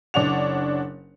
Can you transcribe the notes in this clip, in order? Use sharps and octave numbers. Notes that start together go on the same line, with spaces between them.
F#1 D4 C#5 F#5 F7